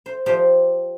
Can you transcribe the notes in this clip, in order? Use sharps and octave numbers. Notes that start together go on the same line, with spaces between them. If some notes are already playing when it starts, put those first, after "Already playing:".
C5
F3 F4 G4 C5 D5 F5